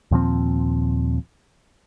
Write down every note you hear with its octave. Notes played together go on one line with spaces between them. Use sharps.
D#2 A#2 F3 C4